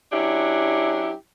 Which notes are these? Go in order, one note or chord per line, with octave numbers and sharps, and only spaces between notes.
F#3 C#4 D4 E4 G4